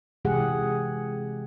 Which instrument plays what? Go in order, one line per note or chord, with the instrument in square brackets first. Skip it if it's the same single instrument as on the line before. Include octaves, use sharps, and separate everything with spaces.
[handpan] C3 E3 G#3 G4 G#4 F#5